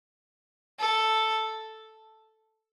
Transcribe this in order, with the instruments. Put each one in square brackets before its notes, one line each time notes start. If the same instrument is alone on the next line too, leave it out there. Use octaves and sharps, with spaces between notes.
[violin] A4